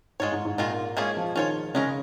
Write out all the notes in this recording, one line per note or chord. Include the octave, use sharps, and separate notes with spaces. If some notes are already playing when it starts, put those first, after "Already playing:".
G#2 G#3 F4 C#5
G#2
G#2
A#2 D#3 G#3 F4 A#4
A#3
G#3 A#3 C#4 F4 G#4 C#5
F3
D#3 C#4 F4 C#5
C#3 G#3 C#4 A#4